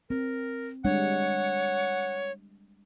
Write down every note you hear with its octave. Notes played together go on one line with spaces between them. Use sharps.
C4 A#4
G3 G#3 D4 C#5 F#5